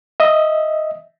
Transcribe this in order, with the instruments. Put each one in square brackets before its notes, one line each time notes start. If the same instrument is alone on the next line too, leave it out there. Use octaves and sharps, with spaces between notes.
[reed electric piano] D#5 E5